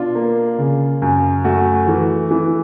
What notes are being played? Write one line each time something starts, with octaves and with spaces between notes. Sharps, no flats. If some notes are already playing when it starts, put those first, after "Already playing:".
Already playing: B2 D4 F4
A#3
C#3
F#2
A3 F#4
E3
E3